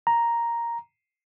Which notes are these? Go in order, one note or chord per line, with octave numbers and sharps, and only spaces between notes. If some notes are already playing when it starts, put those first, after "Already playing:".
A#5